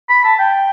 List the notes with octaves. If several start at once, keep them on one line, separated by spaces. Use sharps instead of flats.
B5
A5
G5